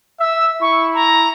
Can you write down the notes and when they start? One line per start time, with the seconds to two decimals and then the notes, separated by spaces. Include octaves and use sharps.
0.20 E5 E6
0.61 E4 C#6
0.94 A#5